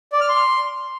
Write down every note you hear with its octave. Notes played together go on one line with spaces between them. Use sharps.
D5
F6
C6